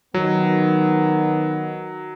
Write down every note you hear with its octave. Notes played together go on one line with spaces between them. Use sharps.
D#3 F#3 B3